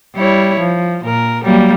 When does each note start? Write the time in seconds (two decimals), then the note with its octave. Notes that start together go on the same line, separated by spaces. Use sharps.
0.15 G3 E4 C#5
0.60 F3
1.05 A#2 A#4
1.44 F#3 G3 A#3